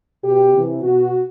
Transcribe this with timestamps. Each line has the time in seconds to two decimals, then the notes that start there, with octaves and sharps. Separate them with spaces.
0.24 B2 G4
0.53 C3 E3
0.82 B2 F#4